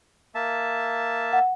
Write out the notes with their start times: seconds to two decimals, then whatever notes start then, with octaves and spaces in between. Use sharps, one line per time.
0.35 A#3 E5 A5
1.33 F#5